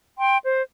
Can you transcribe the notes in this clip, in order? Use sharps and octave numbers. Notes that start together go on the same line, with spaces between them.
G5 C6
C5